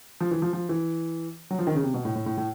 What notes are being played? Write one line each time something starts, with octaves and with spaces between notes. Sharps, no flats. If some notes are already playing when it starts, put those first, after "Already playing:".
F3
E3
F3
F3
E3
F#3
F3
D#3
C#3
C3
B2
A2
A2
A2
A2